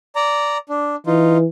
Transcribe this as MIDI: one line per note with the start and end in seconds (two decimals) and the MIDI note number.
0.15 0.58 74
0.15 0.58 82
0.69 0.96 62
1.06 1.47 52
1.06 1.38 63
1.06 1.38 65